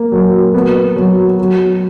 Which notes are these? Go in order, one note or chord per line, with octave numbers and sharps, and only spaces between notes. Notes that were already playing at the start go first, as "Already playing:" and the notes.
Already playing: A#3
F#3
B3
F#3
F#3